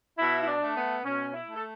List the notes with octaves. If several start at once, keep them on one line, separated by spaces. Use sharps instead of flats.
B2 E4
E4
D4
A3
B3
B2 C#4
E4
A3
A4